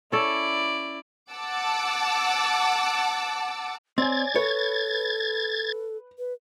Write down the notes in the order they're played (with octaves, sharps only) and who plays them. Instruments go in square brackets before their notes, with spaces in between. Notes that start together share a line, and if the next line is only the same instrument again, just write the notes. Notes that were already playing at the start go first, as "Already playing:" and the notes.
[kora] C#4 A4 [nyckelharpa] E4 D5
[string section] F#5 A5 D6 E6
[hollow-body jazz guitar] C4 [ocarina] C#5 [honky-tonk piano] D5 G#5 [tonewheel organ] G#6 A6
[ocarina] A4 [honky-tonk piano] B4 [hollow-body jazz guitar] C#5
[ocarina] B4